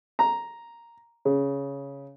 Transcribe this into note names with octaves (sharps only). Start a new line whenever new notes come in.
A#5
C#3